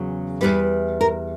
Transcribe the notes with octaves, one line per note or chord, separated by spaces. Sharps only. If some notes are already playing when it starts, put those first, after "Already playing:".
Already playing: E2 C#3 F#3
E2 B2 G3 B4
A#4